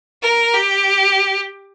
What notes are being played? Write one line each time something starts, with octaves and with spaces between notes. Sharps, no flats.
A#4
G4